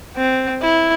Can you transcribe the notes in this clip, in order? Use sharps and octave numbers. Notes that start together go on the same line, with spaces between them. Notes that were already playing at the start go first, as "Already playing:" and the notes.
C4
E4